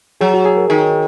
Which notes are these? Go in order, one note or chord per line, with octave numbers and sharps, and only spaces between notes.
F#3 G#4
F#4
G#4
A#4
D#3 G#4